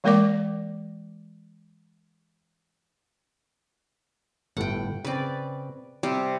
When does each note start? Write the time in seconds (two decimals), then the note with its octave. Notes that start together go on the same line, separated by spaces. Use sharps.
0.04 E3 G#3 A#3 A#4 D5 D6
4.57 G1 A2 A3 F#5 G5
5.05 C#3 C4 B4 D5
6.03 C3 G3 C4 C5